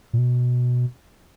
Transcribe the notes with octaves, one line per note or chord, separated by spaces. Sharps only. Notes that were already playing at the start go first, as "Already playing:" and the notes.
A#2
B2